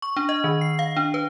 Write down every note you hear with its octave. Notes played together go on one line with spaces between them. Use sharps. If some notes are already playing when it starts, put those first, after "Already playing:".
C#6
D4
D#5
D#3
C7
F5
D4
B4